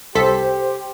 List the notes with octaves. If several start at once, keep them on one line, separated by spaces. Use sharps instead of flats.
C2 G4 A4 C5 C6 B6